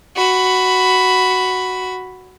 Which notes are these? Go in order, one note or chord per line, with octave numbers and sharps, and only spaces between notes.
F#4 B5